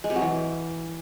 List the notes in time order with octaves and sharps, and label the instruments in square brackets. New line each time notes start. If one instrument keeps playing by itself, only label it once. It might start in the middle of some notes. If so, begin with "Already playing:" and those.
[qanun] G#3
C3
F#3
E3